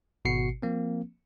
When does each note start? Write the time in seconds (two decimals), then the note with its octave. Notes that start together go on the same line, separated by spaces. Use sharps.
0.25 G#1 B2 F#4 C7 C#7
0.62 F3 A#3 C4